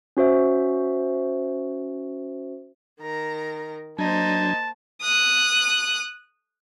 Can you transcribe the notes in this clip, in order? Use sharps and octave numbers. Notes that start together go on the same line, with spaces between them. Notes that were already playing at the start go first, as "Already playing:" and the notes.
C#4 F#4 C5 E5
D#3 A#4 A#5
F#3 A#3 D4 D#4 C5 A5 G#6
D#6 F#6